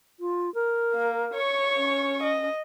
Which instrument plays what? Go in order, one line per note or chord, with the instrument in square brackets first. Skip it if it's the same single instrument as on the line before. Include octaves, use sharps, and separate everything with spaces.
[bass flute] F4
A#4
[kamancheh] A#3
C#5 C#6
[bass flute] C#4
[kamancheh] D#5